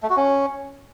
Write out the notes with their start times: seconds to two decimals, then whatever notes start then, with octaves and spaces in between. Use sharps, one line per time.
0.03 A3
0.10 F#4
0.17 C#4